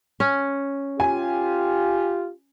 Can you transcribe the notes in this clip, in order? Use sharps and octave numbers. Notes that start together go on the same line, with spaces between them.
C#4
F4 G4 G#5